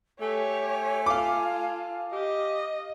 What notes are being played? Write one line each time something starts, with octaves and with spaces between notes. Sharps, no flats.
A3 G4 C#5 G#5
F4 A4 F5 D6
G4 D#5